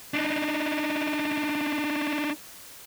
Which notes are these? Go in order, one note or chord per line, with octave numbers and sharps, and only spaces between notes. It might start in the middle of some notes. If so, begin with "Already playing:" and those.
D4 D#4